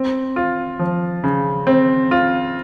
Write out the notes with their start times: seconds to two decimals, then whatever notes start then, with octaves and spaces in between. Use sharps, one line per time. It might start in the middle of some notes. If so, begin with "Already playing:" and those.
Already playing: C4
0.36 F4
0.79 F3
1.24 C#3
1.67 C4
2.11 F4